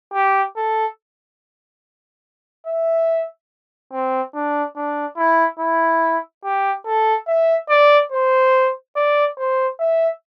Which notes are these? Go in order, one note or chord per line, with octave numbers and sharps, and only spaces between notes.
G4
A4
E5
C4
D4
D4
E4
E4
G4
A4
E5
D5
C5
D5
C5
E5